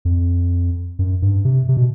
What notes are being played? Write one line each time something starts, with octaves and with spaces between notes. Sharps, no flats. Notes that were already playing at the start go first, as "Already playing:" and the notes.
F2
F#2
G2
C3
C3
B2